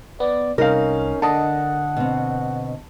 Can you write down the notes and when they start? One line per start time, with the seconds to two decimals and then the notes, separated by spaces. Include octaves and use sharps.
0.20 B3 D5
0.58 C2 C#4 D#4 A#4 F5
1.22 D3 D4 D#5 F#5 A5
1.97 B2 C4